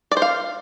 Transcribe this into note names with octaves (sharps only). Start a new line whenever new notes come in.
D5
C5
F5